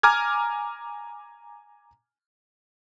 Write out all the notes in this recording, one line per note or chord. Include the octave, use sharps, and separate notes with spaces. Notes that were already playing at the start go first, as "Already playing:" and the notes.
G#5 A#5 D6 F6 G#6